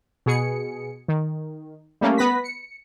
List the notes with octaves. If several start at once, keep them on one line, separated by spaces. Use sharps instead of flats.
B2 G#4 C#7
D#3
G3 A3 A#3 C#4
B3 B4 B5 A#6 B6
C#7